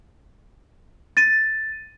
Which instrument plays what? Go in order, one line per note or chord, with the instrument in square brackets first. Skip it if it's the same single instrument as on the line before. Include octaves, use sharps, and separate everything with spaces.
[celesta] A6 D#7